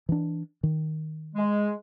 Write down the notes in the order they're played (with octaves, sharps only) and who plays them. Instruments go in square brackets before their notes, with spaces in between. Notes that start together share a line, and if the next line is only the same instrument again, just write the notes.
[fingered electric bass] E3 D4
D#3
[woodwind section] G#3